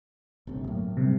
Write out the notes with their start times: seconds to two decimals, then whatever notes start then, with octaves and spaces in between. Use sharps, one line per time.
0.47 G1 D2 C3
0.67 A2 F#3 A#3
0.97 G2 C3